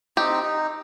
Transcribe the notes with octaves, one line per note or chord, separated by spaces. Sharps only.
C4 D#4 G4
D#4